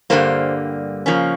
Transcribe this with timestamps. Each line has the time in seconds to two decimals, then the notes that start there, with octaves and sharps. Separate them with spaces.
0.10 G2 D3 G3 A#3 C5
1.06 C#3 F3 A#3 C#4